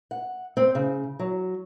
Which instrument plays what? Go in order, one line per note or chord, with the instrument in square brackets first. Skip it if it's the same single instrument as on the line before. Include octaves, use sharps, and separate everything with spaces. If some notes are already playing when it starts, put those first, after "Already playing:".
[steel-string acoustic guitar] F#5
C4
C#3
F#3